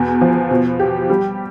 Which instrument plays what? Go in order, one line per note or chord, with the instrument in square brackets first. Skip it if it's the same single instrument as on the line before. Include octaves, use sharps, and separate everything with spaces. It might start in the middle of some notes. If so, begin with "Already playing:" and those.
Already playing: [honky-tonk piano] E2 B2
F3
B2
G4
G3